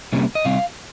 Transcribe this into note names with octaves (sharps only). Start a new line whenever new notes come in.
C3 G3 A#3 C#4
D#5
C3 G3 C4 F5